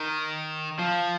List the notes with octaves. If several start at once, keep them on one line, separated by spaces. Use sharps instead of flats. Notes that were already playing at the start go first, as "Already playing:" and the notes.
Already playing: D#3
F3